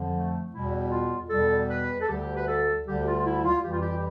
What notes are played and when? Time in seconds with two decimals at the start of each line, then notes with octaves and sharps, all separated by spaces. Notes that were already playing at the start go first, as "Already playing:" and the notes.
Already playing: F2 D3 F3
0.14 A3
0.53 E2 B2 G3 E4
0.91 F4
1.30 E2 B2 G3 A4
1.69 B4
2.01 A4
2.09 D2 D3 G3 G4
2.36 B4
2.47 A4
2.86 D2 D3 G3 G4
3.06 F4
3.19 F4
3.25 E4
3.45 F4
3.64 F2 E3 G3 G4
3.72 F4
3.81 G4